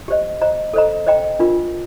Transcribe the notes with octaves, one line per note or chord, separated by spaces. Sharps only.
G4 C5 D#5
C5 D#5 A#5
A4 C5 D#5 A#5
C5 D#5 G5 A#5
D4 F4 A#4